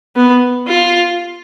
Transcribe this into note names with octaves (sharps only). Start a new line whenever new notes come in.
B3
F4